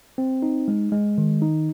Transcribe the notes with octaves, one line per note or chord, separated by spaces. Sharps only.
C4
D#4
G#3
G#3
D#3
D#4